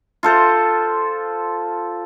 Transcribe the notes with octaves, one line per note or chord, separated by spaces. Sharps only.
F4 A4 C5